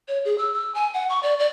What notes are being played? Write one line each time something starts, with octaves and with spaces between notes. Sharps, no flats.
C#5
G#4
E6
E6
G#5
F#5
C#6
D5
D5